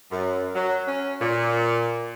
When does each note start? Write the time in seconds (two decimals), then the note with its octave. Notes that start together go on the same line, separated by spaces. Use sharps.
0.11 F#2
0.55 F#3
0.87 C#4
1.20 A#2